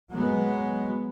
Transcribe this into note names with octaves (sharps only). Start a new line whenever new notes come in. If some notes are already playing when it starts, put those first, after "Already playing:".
F#3 G#3 B3